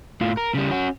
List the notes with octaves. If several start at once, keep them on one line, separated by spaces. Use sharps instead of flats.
A2 F4
A#4
C#3 G3
C#4 F#4